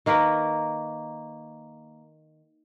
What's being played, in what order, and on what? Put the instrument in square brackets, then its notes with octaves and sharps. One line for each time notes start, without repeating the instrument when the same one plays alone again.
[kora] D#3 A#3 A#4 B4